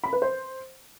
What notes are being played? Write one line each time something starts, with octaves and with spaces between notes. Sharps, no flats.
B5
B4
C5